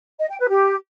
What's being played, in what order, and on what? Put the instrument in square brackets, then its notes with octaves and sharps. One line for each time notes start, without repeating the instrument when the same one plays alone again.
[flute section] D#5
G5
B4
G4